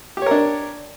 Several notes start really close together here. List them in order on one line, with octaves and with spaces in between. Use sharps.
G4 C#5 A#4 D4